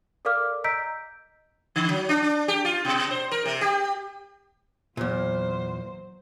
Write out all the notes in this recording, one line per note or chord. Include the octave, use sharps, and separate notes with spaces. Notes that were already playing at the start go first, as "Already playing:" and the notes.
A4 A#4 D5 F5 D6 F6
D#5 A#5 E6 G6 B6 D7
D3
F#3
D4
D4
G4
F4
B2
C5
A#4
C3
G4
E2 A#2 F#3 C5